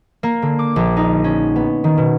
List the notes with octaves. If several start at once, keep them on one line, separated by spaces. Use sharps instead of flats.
A#3
D3
D6
A#1
D#4
C#4
B3
D#3
B2